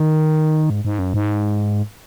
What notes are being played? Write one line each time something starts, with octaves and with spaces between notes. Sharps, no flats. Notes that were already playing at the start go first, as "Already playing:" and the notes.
Already playing: D#3
G#2
G#2
F#2
G#2